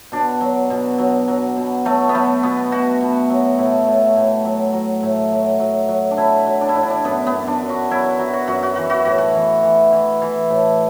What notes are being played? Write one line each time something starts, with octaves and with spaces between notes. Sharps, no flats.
B2 D4
F#3
B2
F#3
F#3
B2
F#3 A3
B3
F#3 A3
B2 B3
B2 F#4
B2
F#3
A2
A2
A2
F#3
F#3
A2
F#3
F#3
F#3
D4
F#3 E4
F#3
D4
E4
A2 D4
E4
D4
F#2 B3
B3
F#2
D4
F#2
F#4
F#3 E4
F#3
F#4
F#2 F#4
F#4
E3 F#4
F#4
A2 F#4
F#4
E3
E3
E3
E3
A2